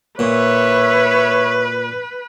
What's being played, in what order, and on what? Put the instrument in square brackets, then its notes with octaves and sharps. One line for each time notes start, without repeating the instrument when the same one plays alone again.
[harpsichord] A#2 [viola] B4 [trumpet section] C#5 E5